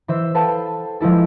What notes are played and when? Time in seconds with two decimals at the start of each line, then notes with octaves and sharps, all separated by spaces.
0.08 E3 C5 E5
0.35 A4 B4 C5 F5 G5 A5
1.00 F3 G#3 E4 A4